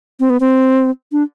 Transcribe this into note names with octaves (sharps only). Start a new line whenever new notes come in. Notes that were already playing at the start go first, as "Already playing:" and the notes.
C4
B3
C4
D4